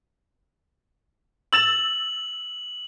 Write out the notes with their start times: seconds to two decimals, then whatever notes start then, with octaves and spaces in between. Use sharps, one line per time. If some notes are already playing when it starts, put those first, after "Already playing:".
1.53 E6 A6 E7 F#7